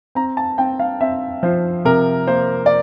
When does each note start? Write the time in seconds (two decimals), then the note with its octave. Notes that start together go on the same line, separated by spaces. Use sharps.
0.15 C4 A#5
0.37 A5
0.58 C4 G5
0.79 F5
1.01 C4 E5
1.43 F3 C5
1.85 C3 A#4
2.28 A#3 C5
2.66 D5